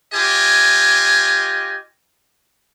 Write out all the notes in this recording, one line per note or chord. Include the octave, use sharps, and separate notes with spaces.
F4 G4 D#5 G#5